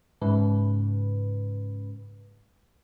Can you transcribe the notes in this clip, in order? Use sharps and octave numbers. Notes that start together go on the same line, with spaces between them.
G#2 C#3 B4